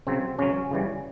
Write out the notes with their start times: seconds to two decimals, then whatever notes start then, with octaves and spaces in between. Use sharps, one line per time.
0.07 C#3 F#3 C4
0.39 C#3 F#3 C#4
0.71 C#3 E3 G3